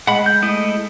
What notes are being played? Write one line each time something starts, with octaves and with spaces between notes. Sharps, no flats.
G#3 F#5 B5
G6
A3 E4 D#5